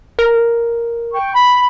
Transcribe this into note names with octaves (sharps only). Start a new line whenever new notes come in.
A#4
G5 C#6
B5